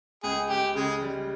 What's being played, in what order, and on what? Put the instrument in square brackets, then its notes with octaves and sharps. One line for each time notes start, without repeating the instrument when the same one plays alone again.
[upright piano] C#2 [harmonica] G#4
[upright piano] C#2 [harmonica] G4
[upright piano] C#3 [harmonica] G#3
[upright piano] G3